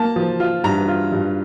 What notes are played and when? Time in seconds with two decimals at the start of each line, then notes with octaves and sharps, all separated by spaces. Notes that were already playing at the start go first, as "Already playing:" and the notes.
Already playing: A#3 A5
0.16 F3
0.40 F4
0.64 G2 A#5
0.88 F4
1.12 G2